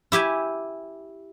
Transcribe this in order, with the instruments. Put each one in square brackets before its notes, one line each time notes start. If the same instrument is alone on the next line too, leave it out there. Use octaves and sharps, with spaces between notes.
[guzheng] E4 G4 E5 G#5